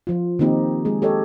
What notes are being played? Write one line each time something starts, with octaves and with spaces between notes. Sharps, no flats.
F3 F4
D#3 A#3 C4 D#4 G4
G#3 G#4
G4 A4 C#5 D#5